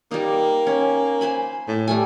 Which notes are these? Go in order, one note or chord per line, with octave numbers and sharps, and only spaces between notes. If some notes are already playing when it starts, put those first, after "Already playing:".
G3 A#3 D#4
C#4
C5 G#5 B5
A2
G3 A3 G#5